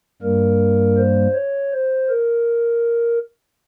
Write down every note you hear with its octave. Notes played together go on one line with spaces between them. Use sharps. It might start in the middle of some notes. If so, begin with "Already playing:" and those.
G2 G3 A#3 A#4
C5
C#5
C5
A#4